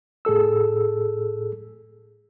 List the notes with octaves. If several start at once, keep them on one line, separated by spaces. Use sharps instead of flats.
A2 G#4 A4 E6